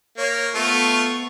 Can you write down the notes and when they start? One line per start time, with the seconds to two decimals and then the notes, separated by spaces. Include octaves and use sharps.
0.17 A#3 C#5
0.55 A3 B3 F4 C#6